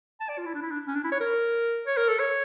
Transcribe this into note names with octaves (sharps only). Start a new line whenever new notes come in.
A5
D5
F4
E4
D4
E4
D4
C#4
D4
E4
C#5
A#4
C#5
A#4
A4
C#5